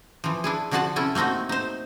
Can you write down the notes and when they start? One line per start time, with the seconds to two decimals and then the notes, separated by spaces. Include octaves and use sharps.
0.24 E3 F3
0.44 D4 E4 G#4
0.71 D3 F3 F#4 G#4 F#5 A5
0.96 C3 C#4 E4 A4
1.15 A3 A#3 C4 D#4 F#4
1.49 D#4 C5